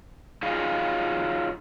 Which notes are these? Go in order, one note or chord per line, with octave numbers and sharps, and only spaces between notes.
F#3 D#4 F4 G#4 F5